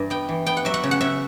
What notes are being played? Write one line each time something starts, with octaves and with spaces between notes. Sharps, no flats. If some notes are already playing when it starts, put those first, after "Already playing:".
Already playing: G2 E3
B3 G5
E3
B3 G5
F#5
F#3 E5
F#5
C#3
F#5
C#3 E5